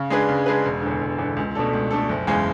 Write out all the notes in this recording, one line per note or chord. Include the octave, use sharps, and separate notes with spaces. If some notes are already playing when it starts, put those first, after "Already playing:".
Already playing: C#3
G#3 D4 G#4 B4
C#3
G#3 D4 G#4 B4
E1
E2 D3
E1
E2 D3
C#2
B2 A3 D4 A4
C#2
B2 A3 D4 A4
F#1
E2 C#3 G#3